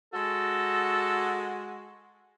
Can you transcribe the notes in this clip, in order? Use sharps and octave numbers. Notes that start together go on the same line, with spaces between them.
G#3 F#4 A4